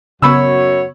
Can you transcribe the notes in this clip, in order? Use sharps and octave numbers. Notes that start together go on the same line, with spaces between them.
F#2 C#3 B3 F#4 C#5 B5 E6